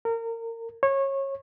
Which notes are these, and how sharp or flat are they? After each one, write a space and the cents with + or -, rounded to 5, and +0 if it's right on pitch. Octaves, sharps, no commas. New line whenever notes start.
A#4 -30
C#5 -25